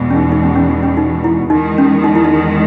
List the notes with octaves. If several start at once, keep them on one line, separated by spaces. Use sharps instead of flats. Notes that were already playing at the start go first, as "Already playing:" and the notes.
Already playing: E2 B2 G#3
C#4
D#4
D#4
C#4
C#4
D#4
C#4
D#4
E4
E2 D#3 G#3 D#4
C#4
D#4
E4
D#4